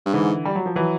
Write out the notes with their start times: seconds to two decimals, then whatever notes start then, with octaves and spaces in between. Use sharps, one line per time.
0.06 G2
0.14 G#2 D3 E3
0.45 G3
0.55 F#3
0.66 F3
0.75 E3 F#3